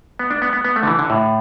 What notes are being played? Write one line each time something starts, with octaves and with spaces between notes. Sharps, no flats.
B3
D4
B3
B3
B3
A3
D3
E3
D3
A2